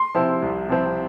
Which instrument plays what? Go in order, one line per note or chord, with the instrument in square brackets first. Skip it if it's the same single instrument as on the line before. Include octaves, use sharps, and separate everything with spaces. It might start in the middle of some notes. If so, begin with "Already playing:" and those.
Already playing: [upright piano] C6
[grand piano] C3 F3 C4 E4
C2
C3 F3 C4 E4